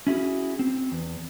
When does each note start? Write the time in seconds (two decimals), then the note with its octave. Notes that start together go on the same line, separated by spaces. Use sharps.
0.07 C#4 E4 F#4 G#4
0.59 C4
0.92 E2